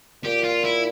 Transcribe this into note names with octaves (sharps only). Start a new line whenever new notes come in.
A#2 G4
F4
E4